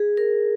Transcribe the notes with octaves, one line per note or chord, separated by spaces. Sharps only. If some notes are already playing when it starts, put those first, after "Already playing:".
Already playing: G#4
A#4